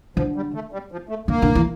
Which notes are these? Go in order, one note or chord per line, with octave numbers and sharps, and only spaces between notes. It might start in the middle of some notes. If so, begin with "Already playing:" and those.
D3 F3
G3
A3
G3
F3
A3
D3 A#3
D3
E3